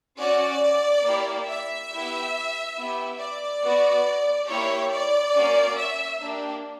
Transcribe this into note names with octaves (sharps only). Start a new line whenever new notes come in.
C#4 F#4 D5
A#3 E4 G4
E5
B3 E4 G4
B3 E4 G4
D5
B3 F#4
A#3 E4 G4 C#5
D5
A#3 C#4 F#4
E5
A#3 D4 G4